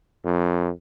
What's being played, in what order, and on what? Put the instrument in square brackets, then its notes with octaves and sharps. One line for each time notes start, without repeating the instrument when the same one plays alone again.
[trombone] F2